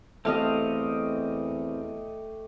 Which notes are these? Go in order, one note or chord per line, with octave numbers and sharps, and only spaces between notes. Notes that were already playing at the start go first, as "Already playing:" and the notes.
E2 A3 C4 G4 D#5 F5